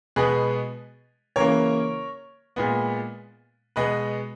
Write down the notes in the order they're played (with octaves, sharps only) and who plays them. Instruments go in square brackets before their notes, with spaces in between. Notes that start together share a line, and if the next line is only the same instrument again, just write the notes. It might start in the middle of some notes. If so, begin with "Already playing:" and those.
[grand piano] B2 G#3 B3 G#4 B4
C#3 E3 A#3 A#4 C#5
A#2 G#3 B3
B2 G#3 B3 B4 D#5